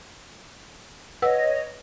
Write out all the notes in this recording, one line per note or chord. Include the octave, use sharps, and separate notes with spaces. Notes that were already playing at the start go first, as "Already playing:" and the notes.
B4 C#5 D#5 F#5 E6